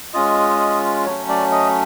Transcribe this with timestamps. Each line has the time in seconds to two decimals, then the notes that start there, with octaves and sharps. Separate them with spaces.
0.14 G#3 C#4 F4 D#5
1.06 F#3 A3 C#4 C#5
1.29 D5
1.52 D#5